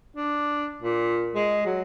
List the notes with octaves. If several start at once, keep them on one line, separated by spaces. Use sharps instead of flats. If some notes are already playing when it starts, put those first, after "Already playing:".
D4
A#2
G#3
F#3